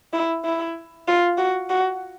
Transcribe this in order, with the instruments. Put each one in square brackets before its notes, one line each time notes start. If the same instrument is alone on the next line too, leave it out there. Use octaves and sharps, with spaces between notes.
[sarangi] E4
E4
F4
F#4
F#4